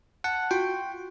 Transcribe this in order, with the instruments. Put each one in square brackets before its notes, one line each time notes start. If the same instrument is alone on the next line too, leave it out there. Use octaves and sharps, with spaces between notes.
[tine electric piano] F#5 A5
[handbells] F4 F#4 [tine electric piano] G5